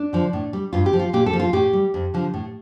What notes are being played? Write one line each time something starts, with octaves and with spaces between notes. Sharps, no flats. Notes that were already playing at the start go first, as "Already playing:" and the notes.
Already playing: D4
D3 F3
A2
G3
G2 F4
G4
F3
F4
A#2 G4
A4
F3
F4
A2 G4
G3
F2
D3 F3
A2